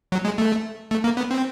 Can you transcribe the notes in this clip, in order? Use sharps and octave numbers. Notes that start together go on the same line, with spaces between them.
F#3
G#3
A3
A3
A#3
B3
C4